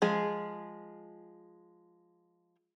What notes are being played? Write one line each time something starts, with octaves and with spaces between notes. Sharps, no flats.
F3 G#3 G#4